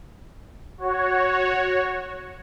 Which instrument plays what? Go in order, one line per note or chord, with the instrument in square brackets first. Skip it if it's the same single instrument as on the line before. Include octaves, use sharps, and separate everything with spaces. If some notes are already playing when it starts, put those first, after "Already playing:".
[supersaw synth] F#4 C#5